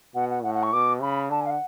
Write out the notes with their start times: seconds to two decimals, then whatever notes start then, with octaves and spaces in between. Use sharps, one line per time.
0.14 B2 F#5
0.30 F#5
0.43 A2 F#5
0.54 F#5
0.62 C#6
0.72 B2 D6
1.01 C#3 B5
1.30 D3 A5
1.40 G#5
1.45 F5
1.50 F#5